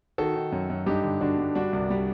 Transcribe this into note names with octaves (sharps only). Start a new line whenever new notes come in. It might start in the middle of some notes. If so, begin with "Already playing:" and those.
D#3 F#4 A4
D#3
F#2
F#2
G2 D#4 G4
D3
D3 D4 F#4
G2
G3 D4 F#4
C2
G3